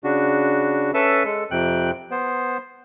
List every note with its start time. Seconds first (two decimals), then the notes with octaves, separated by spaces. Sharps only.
0.04 C#3 D4 F#4
0.94 C#4 A4 B4 E5 A5
1.25 G#3 A4
1.51 F2 C3 G5 F#6
2.11 B3 C5